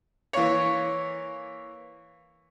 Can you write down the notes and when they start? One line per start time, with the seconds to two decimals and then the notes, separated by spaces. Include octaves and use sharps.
0.33 E3 A#3 C#5